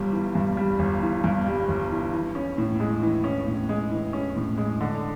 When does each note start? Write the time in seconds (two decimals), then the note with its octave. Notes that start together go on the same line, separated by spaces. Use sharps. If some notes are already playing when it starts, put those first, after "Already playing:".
Already playing: G1 G2 G3
0.13 E3
0.35 G2
0.57 G3
0.79 G1
1.02 E3
1.24 G2
1.47 G3
1.68 G1
1.91 E3
2.13 E3
2.35 C#4
2.58 A2
2.80 G#3
3.02 E3
3.24 C#4
3.47 A2
3.69 G#3
3.91 E3
4.13 C#4
4.36 A2
4.58 G#3
4.81 D3